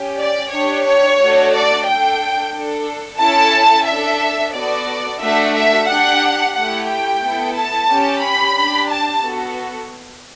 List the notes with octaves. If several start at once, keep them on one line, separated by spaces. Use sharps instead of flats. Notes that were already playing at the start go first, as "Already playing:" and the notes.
Already playing: C#4 G4
D5
D4 G4 C#5
C#5
A3 D4 F#4 A4
D5
D4 A4 G5
D4 A4
C#4 E4 A4 A5
D4 A4 E5
B3 F#4 A4 D5
A3 D4 F#4 A4 E5
E5
D4 G4 F#5
A3 E4 G4 F#5
G5
B3 E4 A4
A5
C#4 G4
B5
D4 G4
A5
B3 F#4 A4